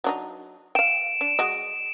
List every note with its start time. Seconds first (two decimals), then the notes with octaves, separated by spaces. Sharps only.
0.04 F#3 D4 D#4
0.75 F5 G5 D7 E7
1.21 D4
1.39 G#3 F#4 D#5